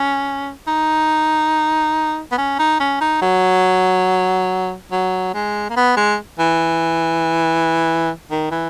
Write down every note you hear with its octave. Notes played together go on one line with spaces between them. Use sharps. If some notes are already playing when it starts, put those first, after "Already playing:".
Already playing: C#4
D#4
B3
C#4
D#4
C#4
D#4
F#3
F#3
G#3
A#3
B3
G#3
E3
D#3
E3